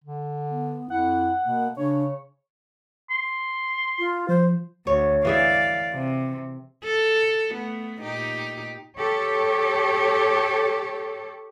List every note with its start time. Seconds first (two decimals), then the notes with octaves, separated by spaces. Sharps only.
0.04 D3
0.50 B3
0.90 F2 E4 F#5
1.45 B2 A#3
1.77 C#3 D4 C#5
3.10 C6
3.99 F4
4.28 F3 C5
4.87 D2 C#5
5.25 E3 G#4 D5 E5 F5
5.93 C3
6.85 A4
7.54 A3 B3
8.00 A#2 D#4 G4
8.98 G4 A4 C#5